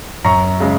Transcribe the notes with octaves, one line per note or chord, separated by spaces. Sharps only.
F#2 A#5 C#6
C#3 G#3